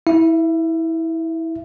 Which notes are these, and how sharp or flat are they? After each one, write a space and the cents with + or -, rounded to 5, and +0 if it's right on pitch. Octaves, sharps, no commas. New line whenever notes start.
E4 -20 E5 +30